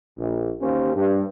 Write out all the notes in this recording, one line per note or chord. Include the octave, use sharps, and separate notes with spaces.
A#1
D#2 A#3 C#4 G4 C5
G2